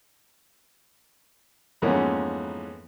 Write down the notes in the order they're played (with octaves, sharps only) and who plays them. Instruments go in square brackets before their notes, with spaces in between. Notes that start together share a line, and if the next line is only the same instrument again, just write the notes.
[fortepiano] F2 G#2 E3 A#3 B3 C#4